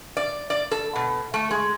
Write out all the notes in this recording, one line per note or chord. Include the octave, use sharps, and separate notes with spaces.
D5
D5
A4
B2
A3
G#3